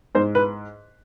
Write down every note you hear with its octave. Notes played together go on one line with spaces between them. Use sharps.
G#2 C5
B4